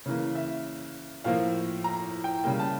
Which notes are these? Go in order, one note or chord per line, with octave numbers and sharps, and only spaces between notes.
C#3 E3 A#3
E5
A2 F3 A#3 F5
A#5
G5
C#3 G3 A#3 G5
A5